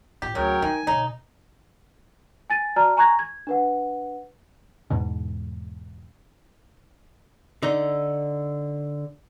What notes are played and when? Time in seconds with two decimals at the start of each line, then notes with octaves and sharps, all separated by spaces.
0.22 A1 F4 G4
0.35 D2 C#3 F#3 A#4 C#5 G5
0.62 D#3 F3 D#4 G#5
0.87 B2 D3 D#4 C#5
2.50 G#5 A6 D#7
2.76 F#4 D5 A5 A#5 F6
2.97 G#5 A#5 C#6 F#6 G#6 A#6
3.19 G#6
3.47 D4 B4 F#5
4.90 E2 G#2 B2
7.63 D3 D#4